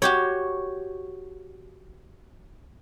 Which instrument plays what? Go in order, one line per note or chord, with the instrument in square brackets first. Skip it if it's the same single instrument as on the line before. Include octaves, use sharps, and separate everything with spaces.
[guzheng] F#4 G4 C#5